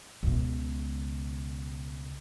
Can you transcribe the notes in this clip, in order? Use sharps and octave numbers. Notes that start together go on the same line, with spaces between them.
C#2 B2